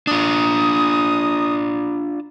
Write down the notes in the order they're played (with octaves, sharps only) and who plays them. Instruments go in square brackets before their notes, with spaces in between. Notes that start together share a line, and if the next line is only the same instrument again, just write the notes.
[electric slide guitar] D4 F4 [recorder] D#6